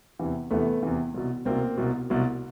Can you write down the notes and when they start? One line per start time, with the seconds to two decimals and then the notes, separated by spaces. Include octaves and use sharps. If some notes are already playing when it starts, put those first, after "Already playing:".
0.19 E2 C3 E3
0.51 E2 C3 E3 A3 B3
0.83 E2 C3 E3
1.14 C2 B2
1.45 C2 B2 A#3 C4
1.77 C2 B2
2.10 C2 B2